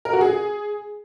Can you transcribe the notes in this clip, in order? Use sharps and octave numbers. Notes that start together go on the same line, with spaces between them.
A#4
F#4
G#4